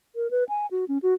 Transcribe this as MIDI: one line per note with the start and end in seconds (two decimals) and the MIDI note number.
0.16 0.30 70
0.31 0.44 71
0.49 0.67 80
0.71 0.85 66
0.88 0.98 61
1.02 1.14 66